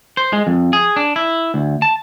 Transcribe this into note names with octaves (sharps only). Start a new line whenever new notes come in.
C5
G#3
F2
G#4
D4
E4
D2
A5